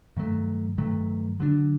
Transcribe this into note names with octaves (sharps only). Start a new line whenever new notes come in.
G2 D#3 F#3 A3
G2 D#3 F#3 A3
D3 F#3 B3 D4